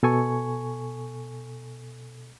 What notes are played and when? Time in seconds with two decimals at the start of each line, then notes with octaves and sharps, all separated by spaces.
0.03 B2 A4 G#5 C#6